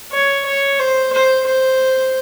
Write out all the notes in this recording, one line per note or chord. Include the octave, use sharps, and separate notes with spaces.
C#5
C#5
C5
C5
C5